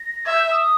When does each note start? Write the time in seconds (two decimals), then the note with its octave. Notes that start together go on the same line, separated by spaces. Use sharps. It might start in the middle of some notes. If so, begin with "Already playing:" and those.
Already playing: A#6
0.25 E5 G#6
0.34 G6
0.43 E6
0.51 D#6